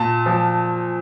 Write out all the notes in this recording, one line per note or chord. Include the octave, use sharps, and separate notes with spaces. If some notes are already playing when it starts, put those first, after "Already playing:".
Already playing: A#2 A5
F3